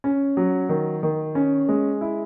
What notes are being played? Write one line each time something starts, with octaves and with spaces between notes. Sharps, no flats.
C#4
F#3
D#3
D#3
C#4
G#3
E4